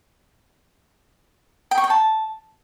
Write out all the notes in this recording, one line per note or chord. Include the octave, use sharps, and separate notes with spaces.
G5
C#6
G5
A5